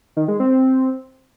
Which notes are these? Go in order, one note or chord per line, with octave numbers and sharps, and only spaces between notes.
D#3
G#3
C4
C4